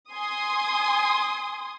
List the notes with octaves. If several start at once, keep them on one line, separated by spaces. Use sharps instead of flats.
G#5 C6 D#6